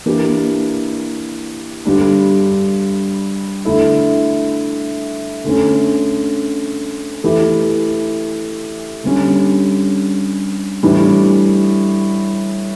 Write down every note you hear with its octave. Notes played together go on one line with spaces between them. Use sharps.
E3 A#3 D4 G4 A#4
G2 D3 G3 D4
D3 A3 E4
D3 A3 C#4
E3 A3 E4 G4
D3 G3 C#4
A2 E3 G3 D4